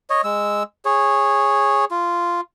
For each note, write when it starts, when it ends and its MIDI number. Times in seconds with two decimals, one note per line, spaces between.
0.10 0.21 73
0.10 0.21 75
0.24 0.63 56
0.24 0.63 88
0.85 1.85 68
0.85 1.85 73
1.91 2.41 65